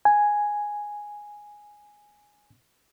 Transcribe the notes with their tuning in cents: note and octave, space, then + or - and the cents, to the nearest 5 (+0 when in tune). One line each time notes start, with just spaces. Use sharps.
G#5 +0